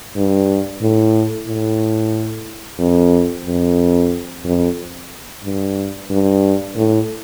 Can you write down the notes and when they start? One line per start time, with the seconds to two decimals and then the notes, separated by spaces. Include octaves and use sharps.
0.16 G2
0.81 A2
1.48 A2
2.79 F2
3.46 F2
4.45 F2
5.44 G2
6.10 G2
6.76 A2